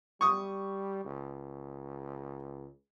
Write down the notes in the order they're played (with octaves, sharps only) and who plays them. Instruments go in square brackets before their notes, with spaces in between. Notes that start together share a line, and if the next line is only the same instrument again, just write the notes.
[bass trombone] G3 [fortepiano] C#6 D#6
[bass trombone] C#2